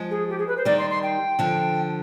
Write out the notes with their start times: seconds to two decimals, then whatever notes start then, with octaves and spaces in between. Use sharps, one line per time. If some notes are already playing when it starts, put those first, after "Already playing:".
Already playing: F3 G#3
0.10 G#4
0.29 G4
0.38 G#4
0.47 B4
0.56 C5
0.65 D#3 G3 D5
0.78 C6
0.90 C6
1.02 G5
1.39 D3 F3